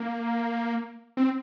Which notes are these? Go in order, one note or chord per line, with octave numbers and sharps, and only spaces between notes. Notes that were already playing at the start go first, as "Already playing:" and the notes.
Already playing: A#3
C4